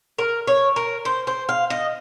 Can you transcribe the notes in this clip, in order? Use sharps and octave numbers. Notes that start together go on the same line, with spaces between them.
A#4
C#5
A#4
C5
C5
F5
D#5